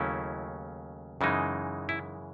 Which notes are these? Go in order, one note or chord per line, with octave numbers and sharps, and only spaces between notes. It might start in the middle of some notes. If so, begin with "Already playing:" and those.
Already playing: D#2 C#3 F#3 A3 C#4 E4
F#2 C#3 E3 G#3 D#4
E4